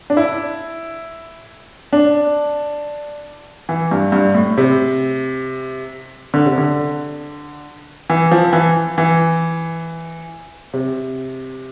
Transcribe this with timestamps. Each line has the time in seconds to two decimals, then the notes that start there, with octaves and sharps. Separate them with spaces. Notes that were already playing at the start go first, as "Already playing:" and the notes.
0.10 D4
0.17 E4
1.93 D4
3.69 E3
3.91 G2
4.12 G2
4.34 A2
4.58 C3
6.34 D3
6.46 C3
6.58 D3
8.10 E3
8.31 F3
8.53 E3
8.98 E3
10.74 C3